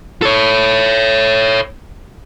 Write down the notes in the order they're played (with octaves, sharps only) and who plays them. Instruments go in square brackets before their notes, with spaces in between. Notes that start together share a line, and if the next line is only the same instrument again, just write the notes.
[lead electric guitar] A4 C#5